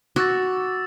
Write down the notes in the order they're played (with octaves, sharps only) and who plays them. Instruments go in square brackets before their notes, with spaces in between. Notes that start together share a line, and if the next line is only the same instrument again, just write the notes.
[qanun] F#4 [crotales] D6 E6 A6